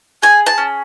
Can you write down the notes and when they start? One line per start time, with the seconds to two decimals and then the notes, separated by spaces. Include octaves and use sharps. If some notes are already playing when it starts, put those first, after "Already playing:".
0.22 G#4 G#5
0.46 A5
0.58 C#4